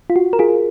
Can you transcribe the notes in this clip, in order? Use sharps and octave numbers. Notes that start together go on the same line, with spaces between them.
F4
F#4
A#4
F4 G#4